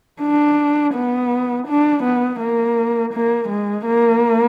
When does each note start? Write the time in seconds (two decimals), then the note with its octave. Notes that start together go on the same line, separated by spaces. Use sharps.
0.21 D4
0.94 B3
1.67 D4
2.04 B3
2.40 A#3
3.13 A#3
3.49 G#3
3.86 A#3